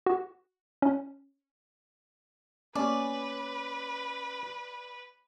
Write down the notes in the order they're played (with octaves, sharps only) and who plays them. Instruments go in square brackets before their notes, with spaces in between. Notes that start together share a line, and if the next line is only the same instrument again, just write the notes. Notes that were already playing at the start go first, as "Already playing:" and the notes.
[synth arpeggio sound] F#4
C#4
[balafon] A#3 B3 G4 [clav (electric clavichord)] C#4 [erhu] B4 [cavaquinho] D5